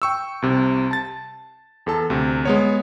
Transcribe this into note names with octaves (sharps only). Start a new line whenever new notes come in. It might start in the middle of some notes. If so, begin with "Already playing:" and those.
G5 C#6 E6
C2 C3
A5 A6
E2 A4 A5
D2 C3
G#3 B3 C#5